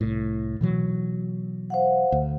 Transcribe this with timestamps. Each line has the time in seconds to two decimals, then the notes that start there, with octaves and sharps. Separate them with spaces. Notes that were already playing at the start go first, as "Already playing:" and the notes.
0.01 C2 A2
0.61 B2 E3 F#3
1.70 C5 F5 F#5
2.12 D2